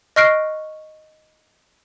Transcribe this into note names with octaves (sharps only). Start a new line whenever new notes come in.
D#5 C#6 F6 F#6 C7 D7